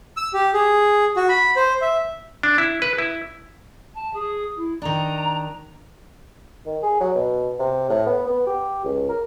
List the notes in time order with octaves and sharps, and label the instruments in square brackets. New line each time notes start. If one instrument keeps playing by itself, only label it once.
[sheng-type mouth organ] E6
G4
G#4
F#4
B5
C5
E5
[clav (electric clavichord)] D4
E4
B4
E4
[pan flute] A5
G#4
E4
[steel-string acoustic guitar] D#3 D4 [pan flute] A#5
[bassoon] D#3
G#4
F#3
B2
C3
A2
B3
B3
G4
C#2
A#4